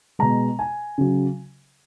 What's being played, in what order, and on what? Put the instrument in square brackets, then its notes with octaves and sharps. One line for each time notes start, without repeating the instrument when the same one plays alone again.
[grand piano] B2 G#3 A#5
G#5
C#3 F#3